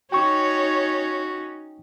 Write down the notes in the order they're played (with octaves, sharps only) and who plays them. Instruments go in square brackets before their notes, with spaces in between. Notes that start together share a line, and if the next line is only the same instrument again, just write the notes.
[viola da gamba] C#4 D#4 [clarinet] F#4 [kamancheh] C#5 [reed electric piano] G5 C#6